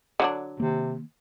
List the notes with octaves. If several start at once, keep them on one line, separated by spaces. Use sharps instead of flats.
D3 F#3 D4
C3 D#3 A#3